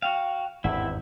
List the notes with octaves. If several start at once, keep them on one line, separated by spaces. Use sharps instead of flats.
F#4 F5 G5
G#1 E2 G2 C4 E4 E5 F#5